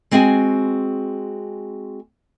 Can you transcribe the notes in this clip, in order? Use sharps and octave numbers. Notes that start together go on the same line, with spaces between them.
G#3 C4 E4 F#4 G#4 G#5